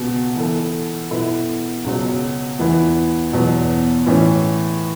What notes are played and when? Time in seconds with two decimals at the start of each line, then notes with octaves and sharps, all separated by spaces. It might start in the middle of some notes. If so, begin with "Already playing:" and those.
Already playing: C#2 B2 B3 F#4
0.36 E3 B3 A4
1.11 B2 B3 E4 A4
1.85 C#2 B2 F#3
2.59 E2 E3 B3
3.33 E2 B2 F#3
4.06 A2 E3 C#4